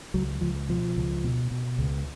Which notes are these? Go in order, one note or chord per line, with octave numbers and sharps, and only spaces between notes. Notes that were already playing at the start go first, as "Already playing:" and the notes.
C#2 F#3
C#2 F3
B2 F3
C#2
B2
B2
C#2